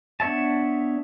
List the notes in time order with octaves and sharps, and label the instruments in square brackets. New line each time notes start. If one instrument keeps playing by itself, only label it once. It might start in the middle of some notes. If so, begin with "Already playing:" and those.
[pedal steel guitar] B3 D4 C#5 E5 A5